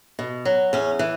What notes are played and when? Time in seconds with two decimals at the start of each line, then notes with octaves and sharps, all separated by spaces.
0.19 B2
0.45 F#3
0.73 E2 C#4
0.99 E3